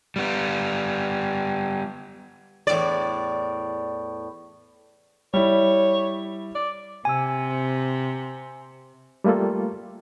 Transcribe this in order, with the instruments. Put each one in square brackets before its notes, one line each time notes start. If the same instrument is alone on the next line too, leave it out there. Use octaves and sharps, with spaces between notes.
[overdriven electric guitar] G3 B3
[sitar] E2 A2 D5
[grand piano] G3 E4 [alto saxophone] C#5
[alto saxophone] D5
[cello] C3 C4 [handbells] G#5 E6
[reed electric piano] G3 A3 A#3 F4 A4